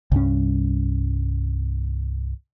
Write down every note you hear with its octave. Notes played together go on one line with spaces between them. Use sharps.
C2 G2 C#4